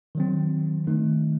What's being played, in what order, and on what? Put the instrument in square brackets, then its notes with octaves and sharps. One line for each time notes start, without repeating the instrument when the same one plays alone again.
[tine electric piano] D#3 F#3 C4
D#3 A3 D#4